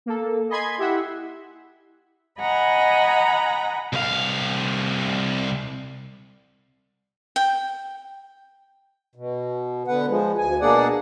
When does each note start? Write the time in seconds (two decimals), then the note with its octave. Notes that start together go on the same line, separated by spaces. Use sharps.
0.06 A#3 A4
0.49 D#5 G#5 B5 C6 G#6
0.78 E4 G4 E5 F#5
2.39 D#5 F#5 G#5 A#5 B5
3.93 C2 F5
7.36 G5
9.16 B2
9.88 D3 B3 B4 F#5
10.08 F3 G#3
10.38 D2 G#5
10.61 B2 A#3 D4 G#4 D5 F#5